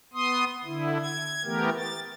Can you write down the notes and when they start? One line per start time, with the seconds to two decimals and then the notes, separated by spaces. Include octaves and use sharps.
0.14 B3 C6 D#6
0.64 D3 E4
1.00 G#6
1.45 E3 A3 B3 G4 A#4
1.77 A6